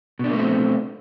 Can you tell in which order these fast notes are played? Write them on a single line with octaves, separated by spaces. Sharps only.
B2 D4 A#3 A3 C4